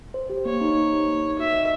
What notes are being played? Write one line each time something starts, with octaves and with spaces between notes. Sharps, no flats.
C5
G4
A#3 C#5
D#4
C5
G4
A#3
D#4
F#4 E5
D#5